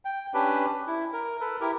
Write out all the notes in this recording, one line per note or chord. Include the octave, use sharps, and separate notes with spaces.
G5
C#4 D4 G4 B4
E4
A#4
A4 B4
E4 G4 A#4